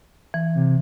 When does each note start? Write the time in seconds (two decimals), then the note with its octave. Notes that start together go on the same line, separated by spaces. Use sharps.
0.34 E3
0.54 C3